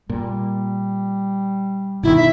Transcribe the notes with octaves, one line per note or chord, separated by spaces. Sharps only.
A#2 G3
B2 D3 D#3 E4
E5